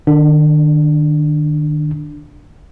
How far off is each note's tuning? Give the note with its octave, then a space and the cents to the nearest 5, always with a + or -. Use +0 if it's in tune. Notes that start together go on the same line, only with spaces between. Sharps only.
D#3 -35 D4 +0